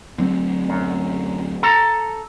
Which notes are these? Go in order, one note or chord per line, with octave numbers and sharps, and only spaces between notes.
D2 F#3 C4
F#2
A4 A#5